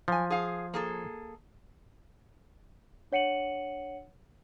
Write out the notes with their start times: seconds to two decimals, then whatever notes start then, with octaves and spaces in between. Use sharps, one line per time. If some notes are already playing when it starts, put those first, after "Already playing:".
0.08 F3 F#3 G#5
0.30 G#4 F5
0.74 A#3 G#4 A4
3.12 D4 C#5 F#5 C#7 D#7 F#7